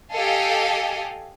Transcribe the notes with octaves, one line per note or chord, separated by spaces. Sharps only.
G4 A4 D#5 F5 G#5